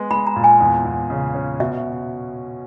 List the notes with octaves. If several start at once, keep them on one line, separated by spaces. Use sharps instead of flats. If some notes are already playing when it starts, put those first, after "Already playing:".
Already playing: G#3 B3
G#3 B5
A#5
A#2
G#5
E2
E2
C#3
C#4
B2 E5